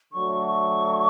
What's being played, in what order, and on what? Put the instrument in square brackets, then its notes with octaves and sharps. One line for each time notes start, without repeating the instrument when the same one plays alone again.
[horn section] D3 F#3 A3 [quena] C#6
[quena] C#6